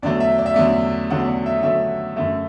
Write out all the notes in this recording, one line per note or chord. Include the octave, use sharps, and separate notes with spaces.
E2 D3 F#3 A3 D5
E5
D5
E5
E2 D3 F#3 A3 D5
E2 D3 F#3 A3 F#5
D5
E5
E2 D3 F#3 A3 E5
F#2 D3 A3 E5